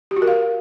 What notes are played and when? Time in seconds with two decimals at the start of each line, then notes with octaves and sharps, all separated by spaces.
0.11 G4
0.16 F#4
0.22 A#4
0.27 F5